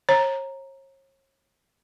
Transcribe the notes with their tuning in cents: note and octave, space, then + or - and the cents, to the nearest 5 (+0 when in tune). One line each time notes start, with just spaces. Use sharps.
C#5 -40 A#5 +0